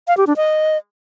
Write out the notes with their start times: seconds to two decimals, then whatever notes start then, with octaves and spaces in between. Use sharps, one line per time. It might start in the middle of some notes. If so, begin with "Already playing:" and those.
0.08 F5
0.17 G4
0.27 D4
0.37 D#5